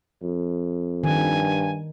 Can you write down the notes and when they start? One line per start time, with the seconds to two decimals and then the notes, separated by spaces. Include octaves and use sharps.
0.23 F2
1.04 G2 D#3 G#5